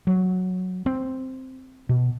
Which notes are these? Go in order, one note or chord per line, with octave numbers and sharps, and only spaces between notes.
F#3
C4
B2